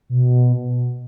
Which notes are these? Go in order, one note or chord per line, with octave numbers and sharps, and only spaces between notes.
B2